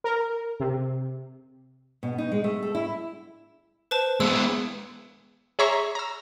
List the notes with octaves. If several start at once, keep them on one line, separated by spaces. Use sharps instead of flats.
A#4
C3
B2
D#4
G#3
A3
A4
E4
B4 C5 A5
G#3 B3 E6
G#4 C#5 E5 A#5 C6 C#6
A#5 E6